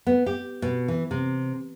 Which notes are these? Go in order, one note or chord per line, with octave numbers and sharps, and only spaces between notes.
B3
G4
B2
E3
C3